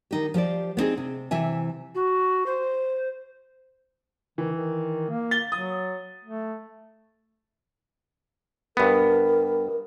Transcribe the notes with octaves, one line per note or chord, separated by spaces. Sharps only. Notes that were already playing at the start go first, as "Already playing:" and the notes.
D#3 D#4 G4
F3 G4 C5 D5
B3 C4 D#4 G#4
C3
C3 E3 E5 G#5
F#4
C5
D#3 E3
D#3
A#3
A6 G7
F#3 D#6
A3
G2 B3 A#4